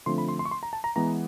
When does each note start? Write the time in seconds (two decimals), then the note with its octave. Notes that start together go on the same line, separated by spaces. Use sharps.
0.06 D3 F3 A3 C4 C6
0.18 B5
0.28 C6
0.39 C6
0.45 C#6
0.51 C6
0.63 A#5
0.73 A5
0.84 A#5
0.96 E3 G#3 B3 A#5